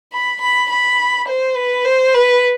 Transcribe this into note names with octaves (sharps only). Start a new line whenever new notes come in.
B5
B5
B5
C5
B4
C5
B4